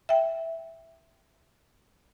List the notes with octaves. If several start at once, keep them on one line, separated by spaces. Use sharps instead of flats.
E5 G5